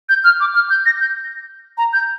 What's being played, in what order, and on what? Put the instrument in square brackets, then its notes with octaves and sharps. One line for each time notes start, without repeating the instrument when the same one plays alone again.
[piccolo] G6
F6
D6
F6
G6
A#6
G6
A#5
G6